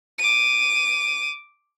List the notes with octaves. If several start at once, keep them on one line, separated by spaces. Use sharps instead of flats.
D6 D#7